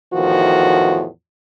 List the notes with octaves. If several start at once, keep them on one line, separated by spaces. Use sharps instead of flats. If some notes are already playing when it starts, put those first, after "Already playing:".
E2 A2 D#3 F3 F#4